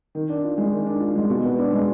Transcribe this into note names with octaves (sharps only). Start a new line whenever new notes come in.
D#3
D4
F4
G#3
D#3
D4
F4
G#3
B2
B3
D4
G#3